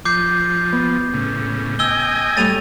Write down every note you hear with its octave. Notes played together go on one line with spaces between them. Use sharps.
F3 D6 G6 C7
B3
A2 C#3
D#5 G5 G#5 E6 G7
A2 G3 A3 A6 D#7 F7